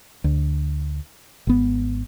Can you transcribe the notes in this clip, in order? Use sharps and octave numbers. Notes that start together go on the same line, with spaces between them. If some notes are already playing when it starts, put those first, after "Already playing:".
D2
G#1 B3